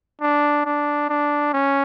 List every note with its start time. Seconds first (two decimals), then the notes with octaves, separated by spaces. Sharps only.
0.21 D4
0.65 D4
1.10 D4
1.53 C#4